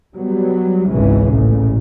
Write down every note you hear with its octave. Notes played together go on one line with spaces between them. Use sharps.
F#3 G3 B3
G#1 C#2 C#3 E3 G#3 C#4
A1 A#2 C#3